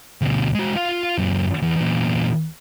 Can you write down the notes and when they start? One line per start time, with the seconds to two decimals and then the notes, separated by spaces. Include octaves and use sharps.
0.22 D2 B2
0.55 G#3 F#4
0.76 F4 F5
1.18 F#2 A#2
1.62 E2
1.76 E2 A#2